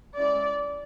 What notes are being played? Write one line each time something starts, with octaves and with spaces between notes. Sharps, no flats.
G#3 C#4 E4 D5